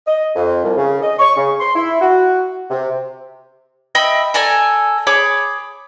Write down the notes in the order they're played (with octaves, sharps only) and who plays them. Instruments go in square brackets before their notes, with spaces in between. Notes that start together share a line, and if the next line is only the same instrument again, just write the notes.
[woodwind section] D#5
F2
C2
C#3
D#5
C#6
C#3
C6
E4
F#4
C3
[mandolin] D#5 E5 G5 B5
A4 D5 G#5 A#5
G#4 C#5 B5 D6